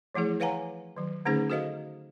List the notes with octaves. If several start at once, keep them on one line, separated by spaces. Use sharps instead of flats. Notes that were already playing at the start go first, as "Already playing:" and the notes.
E3 F3 A3 E4 G#4
B4 C#5 F5 F#5 G#5 A#5
D#3 F#3
D3 A3 C#4 D#4 G#4 C5
F#4 A4 C5 D#5 F5